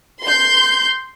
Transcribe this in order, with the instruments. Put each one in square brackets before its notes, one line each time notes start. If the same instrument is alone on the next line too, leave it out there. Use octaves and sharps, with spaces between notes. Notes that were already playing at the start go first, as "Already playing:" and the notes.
[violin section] C6 G6